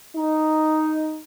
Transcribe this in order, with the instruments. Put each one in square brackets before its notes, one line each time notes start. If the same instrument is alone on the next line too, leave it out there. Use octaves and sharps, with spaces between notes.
[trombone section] D#4